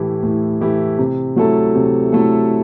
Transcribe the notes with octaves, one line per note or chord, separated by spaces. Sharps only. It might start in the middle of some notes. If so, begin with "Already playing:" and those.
Already playing: A2 E3 A3 E4 G4
A2
E3 A3 E4 G4
C3
F#3 A3 E4 A4
C3
F#3 A3 E4 A4